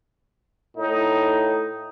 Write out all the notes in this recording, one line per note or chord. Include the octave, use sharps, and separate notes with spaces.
A2 D#4